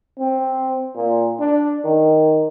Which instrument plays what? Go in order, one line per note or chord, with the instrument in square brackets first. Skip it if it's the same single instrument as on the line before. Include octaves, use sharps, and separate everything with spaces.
[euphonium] C4
A#2
D4
D#3